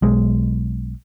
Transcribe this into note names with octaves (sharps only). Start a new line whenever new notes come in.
B1 G#3